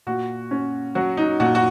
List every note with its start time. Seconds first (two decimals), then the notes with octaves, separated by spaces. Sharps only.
0.07 A#2 F#4
0.51 C#4
0.95 F#3 F#4
1.17 D#4
1.40 A#2 F#4
1.55 F#4